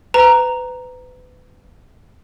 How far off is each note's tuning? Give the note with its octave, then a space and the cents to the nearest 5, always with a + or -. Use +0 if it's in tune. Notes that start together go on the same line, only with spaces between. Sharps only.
B4 +30 A#5 +0